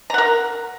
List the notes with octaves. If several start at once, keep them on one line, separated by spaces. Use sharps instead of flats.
A#4 F#5 A#5